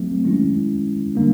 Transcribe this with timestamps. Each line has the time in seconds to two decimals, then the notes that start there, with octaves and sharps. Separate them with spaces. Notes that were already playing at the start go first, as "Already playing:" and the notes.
Already playing: F#3 A3 C4
0.24 D#3 G#3 C#4 E4
1.15 D3 G3 A#3 D4